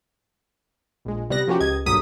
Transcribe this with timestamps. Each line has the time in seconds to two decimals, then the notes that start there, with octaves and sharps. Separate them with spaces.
1.05 A#1 G#3
1.30 C3 G3 B3 F#6 A#6
1.47 F3 A#3 C#4 F#4 G4
1.60 C#2 D#5 G#6
1.86 B1 G2 F#3 A#3 D#6 B6